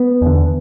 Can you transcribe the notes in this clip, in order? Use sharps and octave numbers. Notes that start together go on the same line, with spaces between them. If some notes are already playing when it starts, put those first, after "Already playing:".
Already playing: B3
E2 D3